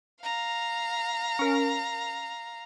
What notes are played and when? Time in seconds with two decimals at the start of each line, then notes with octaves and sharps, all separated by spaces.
0.23 F5 A#5
1.39 C#4 A#4